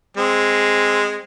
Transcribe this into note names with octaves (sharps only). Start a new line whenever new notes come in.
G#3 C4